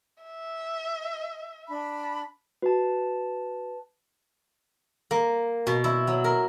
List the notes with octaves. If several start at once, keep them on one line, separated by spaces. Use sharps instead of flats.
E5
D4 B5
F#4 B4 A5
A#3
B2
E4
F#3
A#4